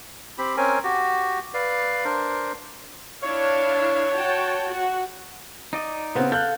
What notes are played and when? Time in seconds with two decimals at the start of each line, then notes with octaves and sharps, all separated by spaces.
0.38 C4 G4 B5
0.57 C4 C#4 A#4 G#5
0.84 F#4 G4
1.54 B4 D5 F5
2.05 D4 A#4 C5
3.23 D4 E4 C#5 F5
4.14 F#4 G5 A5
4.67 F#4
5.73 D#4 D5 D#5
6.15 C#3 B3 C4
6.32 A4 F5 F#6 G6